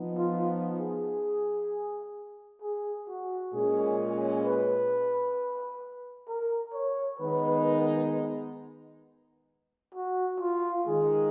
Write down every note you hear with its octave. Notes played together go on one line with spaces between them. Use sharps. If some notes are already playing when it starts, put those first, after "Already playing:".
Already playing: F3 B3 D#4
F4
G#4
G#4
F#4
A#2 G#3 C#4 G#4
B4
A#4
C#5
D#3 G#3 B3 D#4 B4
F#4
F4
D#3 G#3 D#4 G#4